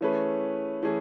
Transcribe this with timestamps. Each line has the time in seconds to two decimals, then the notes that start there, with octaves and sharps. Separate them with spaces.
0.01 E3 A3 C#4 G#4 B4
0.83 E3 A3 C#4 G#4